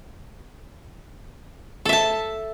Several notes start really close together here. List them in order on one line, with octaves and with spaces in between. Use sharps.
A4 E5 A5